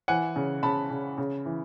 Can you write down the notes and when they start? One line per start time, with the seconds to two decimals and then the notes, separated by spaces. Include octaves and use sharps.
0.08 E3 F#5 G#5
0.36 C#3
0.63 C#3 A5 B5
0.91 C#3
1.18 C#3
1.45 E3